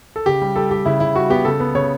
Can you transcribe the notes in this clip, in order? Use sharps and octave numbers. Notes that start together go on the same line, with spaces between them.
A4
C#3 G4
G3
G3 A4
G3 G4
C#3 E4
C#3 E4
G3 F#4
B3 G4
C#3 A4
B3
C#3 C#5